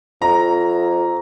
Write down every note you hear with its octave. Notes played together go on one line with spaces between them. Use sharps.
F2 A#5